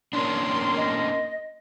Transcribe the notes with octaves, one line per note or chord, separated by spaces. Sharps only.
A#3 C#4 D4 A#4 C6
D#5